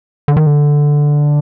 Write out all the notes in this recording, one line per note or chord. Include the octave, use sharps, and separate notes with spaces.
D3
D#3
D3